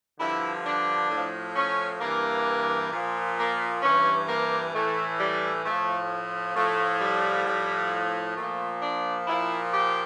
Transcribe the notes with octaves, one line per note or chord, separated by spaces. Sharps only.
G2 D3 F3 E4
D4
A2 F3
C#4
G2 E3 A#3
A#2 F3
A#3
G2 E3 C#4
A#3
A2 E3 A3
G3
A2 F3 A3
A2 F3 A3
G3
A2 F3
A#2 F3 A3
D4
A#2 F3 E4
G4